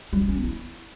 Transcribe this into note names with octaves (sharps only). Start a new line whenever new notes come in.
G3
D#4
C#4
B3
E4